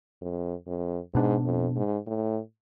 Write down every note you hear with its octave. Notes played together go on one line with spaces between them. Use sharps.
F2
F2
G#2 B2 B3 D4
F2
G#2
A2